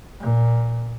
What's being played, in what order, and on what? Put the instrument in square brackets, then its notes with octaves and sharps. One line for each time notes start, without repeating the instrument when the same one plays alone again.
[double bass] A#2